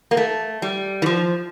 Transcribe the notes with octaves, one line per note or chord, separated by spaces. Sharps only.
A#3
A3
G3
E3
F3